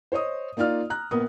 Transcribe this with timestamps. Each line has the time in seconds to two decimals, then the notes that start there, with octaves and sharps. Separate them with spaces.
0.12 C5 C#5 D#5 D#6
0.57 A#3 D#4 F4 D5 F6
0.90 A#5 F#6
1.11 A#1 B3 A#4 D#6